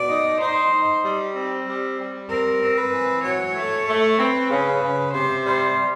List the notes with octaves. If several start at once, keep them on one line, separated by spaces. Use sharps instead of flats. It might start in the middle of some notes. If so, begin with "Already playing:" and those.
Already playing: B2 D5
D#4
D#4 C5
D#4
G3
C4
G3
G3
C4 A#4
C4
B4
E3
F#3 C#5
A3
A3
C4 B4
C#3
C#3
C3 C5
G3 C5
G3